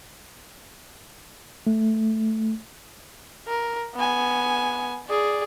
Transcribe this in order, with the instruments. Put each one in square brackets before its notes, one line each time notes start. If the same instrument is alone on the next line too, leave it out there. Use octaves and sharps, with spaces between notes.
[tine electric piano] A3
[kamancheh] A#4
B3 G#5
G#4 D5